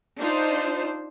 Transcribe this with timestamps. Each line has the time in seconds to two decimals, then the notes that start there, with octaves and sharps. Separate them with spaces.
0.18 D4 D#4 F4 C5